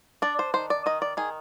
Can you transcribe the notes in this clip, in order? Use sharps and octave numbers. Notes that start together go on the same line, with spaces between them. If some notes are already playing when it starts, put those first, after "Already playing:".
D4 D5
C5
D#3 C5
D5
D#3 D#5
D5
D#3 G#4